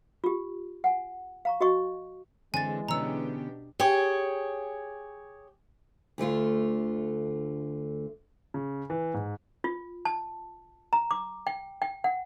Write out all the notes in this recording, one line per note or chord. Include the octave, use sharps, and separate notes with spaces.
F4 G4
F#5 G#5
F5 A#5 C#6
F#4 D#5 C#6
D3 E3 G#3 C4 D4 G#5 A6
B2 D3 B3 C#4 D4 G4 A#5 E6
G4 G#4 C#5
D2 D3 A3 F4
C#3
E3
G#2
F4
A5
A#5
D6
G5
G5
F#5